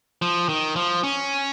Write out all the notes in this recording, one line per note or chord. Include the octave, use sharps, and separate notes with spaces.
F3
D#3
F3
C#4